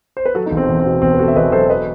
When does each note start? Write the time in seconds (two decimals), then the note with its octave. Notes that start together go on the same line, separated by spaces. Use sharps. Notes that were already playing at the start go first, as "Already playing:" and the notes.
0.17 C5
0.26 B4
0.35 F#3 F#4 A4
0.46 D#4
0.51 E1
0.57 C4
0.69 E2
0.80 C4
0.86 B2
1.02 E1 C4
1.14 B4
1.19 E1 F#4 A4
1.28 E5
1.36 E1 B4 D#5
1.52 F#3 A4 C5
1.69 B4 D#5